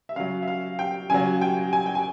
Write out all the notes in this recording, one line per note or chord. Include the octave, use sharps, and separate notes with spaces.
E5
C#3 F#3 F5
E5
F5
G5
C#3 F#3 G#5
G5
G#5
G5
G#5